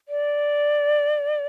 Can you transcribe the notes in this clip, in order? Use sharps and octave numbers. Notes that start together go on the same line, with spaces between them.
D5